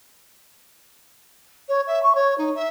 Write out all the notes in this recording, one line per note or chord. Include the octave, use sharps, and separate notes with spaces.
C#5
E5
C#6
C#5
D#4
E5